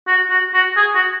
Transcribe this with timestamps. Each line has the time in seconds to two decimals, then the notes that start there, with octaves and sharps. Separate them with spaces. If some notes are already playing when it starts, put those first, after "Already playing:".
0.07 F#4
0.30 F#4
0.54 F#4
0.77 G#4
0.95 F#4